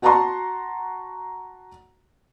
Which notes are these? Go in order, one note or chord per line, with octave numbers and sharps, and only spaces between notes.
F#4 F#5 A5 A#5 C6 C#6